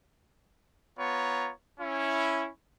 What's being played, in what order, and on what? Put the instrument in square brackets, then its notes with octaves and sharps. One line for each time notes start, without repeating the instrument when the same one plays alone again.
[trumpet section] B3 F4 C#5 A#5
C#4 E4